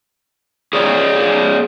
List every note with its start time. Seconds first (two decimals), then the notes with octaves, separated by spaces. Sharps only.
0.73 G#4 C#5 D5